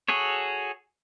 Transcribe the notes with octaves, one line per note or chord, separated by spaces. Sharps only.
F#4 G#4 A4 C#5